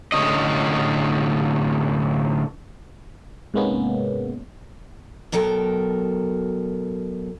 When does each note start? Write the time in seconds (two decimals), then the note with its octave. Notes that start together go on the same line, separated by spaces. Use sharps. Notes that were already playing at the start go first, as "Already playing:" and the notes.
0.12 A2 D3 C#4 D#5
3.54 G#2 C3 G#3 A#3 B3 C#4
5.32 B2 F#3 A4 A#4 G5